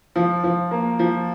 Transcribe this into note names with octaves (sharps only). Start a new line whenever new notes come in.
F3
F3
A#3
F3